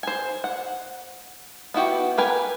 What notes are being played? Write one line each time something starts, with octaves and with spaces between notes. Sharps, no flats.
C5 G#5
F#5
B3 E4 F#4 G4
G4 A#4 B4 G#5